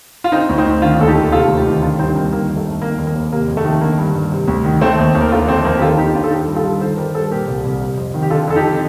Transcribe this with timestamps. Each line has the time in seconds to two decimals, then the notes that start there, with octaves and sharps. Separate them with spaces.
0.24 F4
0.32 D3 C4 D#4
0.49 D2
0.58 C4 D#4
0.65 D2
0.82 D#3 D4 F4
0.99 D#2 A4
1.07 D#4 G4
1.16 D#2
1.32 C3 F4 A4
1.48 D2
1.57 D#4 G4
1.66 D#3
1.82 D3 D4 F4
1.99 G2 C4 D#4
2.10 C4
2.15 G2 A#3 D4
2.32 D#3 A#3
2.48 F2
2.57 A3
2.65 F2
2.82 D#3 A#3
2.98 D#2
3.07 A#3
3.15 D#2
3.32 C3 A#3
3.48 F2
3.57 A3
3.65 D#3
3.81 D3 A#3
3.98 G2
4.15 G2
4.32 C3
4.48 D2
4.65 D#3
4.81 D#3 A3 C4
4.98 D#2
5.15 D#2
5.21 A#4
5.31 D3 F4 A4
5.48 F2 A3 C4
5.64 F2 A#3
5.77 G4
5.81 D#3 F4 A4
5.98 D#2 D#4 G4
6.14 D#2 D4 F4
6.24 A4
6.31 D#3 D#4 G4
6.48 G2
6.56 F4 A4
6.64 G2
6.81 D#3 A4 C5
6.97 G2 G4 A#4
7.15 G2 A4 C5
7.31 A#2 G4 A#4
7.47 C2
7.65 C2
7.81 C3
7.97 F2
8.14 D#3
8.22 G4
8.30 D3 F4 A4
8.48 F2 A4
8.55 D#4 G4